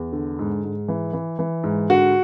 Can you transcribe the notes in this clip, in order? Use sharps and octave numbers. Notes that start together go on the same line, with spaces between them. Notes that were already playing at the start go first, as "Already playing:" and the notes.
Already playing: E2
D3
G#2
G#2
E3
E3
E3
G#2
D3 F#4